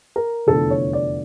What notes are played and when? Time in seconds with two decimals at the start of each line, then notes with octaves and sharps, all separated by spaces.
0.16 A#4
0.47 F1 E2 D3 F3 A4
0.70 C#5
0.93 D5